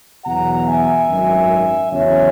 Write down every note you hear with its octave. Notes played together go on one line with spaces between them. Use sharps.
E2 B2 F#3 F#5 A#5
E5 G#5
G#1 F#2 D#3
E2 C#3 F#3 C#4 C#5 E5